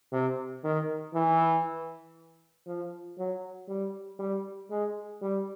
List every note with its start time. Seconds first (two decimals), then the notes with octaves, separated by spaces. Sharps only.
0.12 C3
0.64 D#3
1.14 E3
2.67 F3
3.18 F#3
3.68 G3
4.19 G3
4.70 G#3
5.22 G3